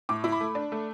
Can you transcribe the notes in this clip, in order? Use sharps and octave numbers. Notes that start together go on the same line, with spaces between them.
A2 D6
E4
B5
A3
D4
A3